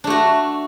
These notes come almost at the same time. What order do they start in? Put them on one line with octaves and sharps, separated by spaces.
D4 A3 F#4